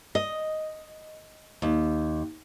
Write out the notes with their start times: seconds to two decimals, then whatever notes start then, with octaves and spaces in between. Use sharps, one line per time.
0.15 D#5
1.62 D#2